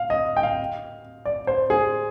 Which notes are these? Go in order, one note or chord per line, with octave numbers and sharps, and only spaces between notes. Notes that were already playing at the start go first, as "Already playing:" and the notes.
Already playing: F5
D#5
G5
F5
D5
C5
G#4